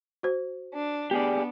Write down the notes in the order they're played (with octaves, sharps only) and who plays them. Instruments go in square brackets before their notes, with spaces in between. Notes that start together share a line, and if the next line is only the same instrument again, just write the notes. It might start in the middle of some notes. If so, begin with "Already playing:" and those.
[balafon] F#4 C5
[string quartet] D4
[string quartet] B3 D4 [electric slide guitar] G4 G#4 D5